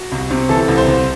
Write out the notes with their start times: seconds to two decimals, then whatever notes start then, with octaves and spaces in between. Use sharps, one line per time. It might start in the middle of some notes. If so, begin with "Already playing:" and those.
Already playing: F#4
0.12 C2
0.31 C3
0.49 E3 A4
0.68 C2
0.78 C5
0.87 C2